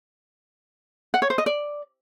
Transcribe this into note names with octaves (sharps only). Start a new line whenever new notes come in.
F#5
C#5
C5
D#5
D5